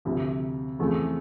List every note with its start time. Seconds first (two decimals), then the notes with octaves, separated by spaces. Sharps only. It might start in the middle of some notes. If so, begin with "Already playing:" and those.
0.05 D2 C3 F3
0.79 E2 C#3 F3 A3 C4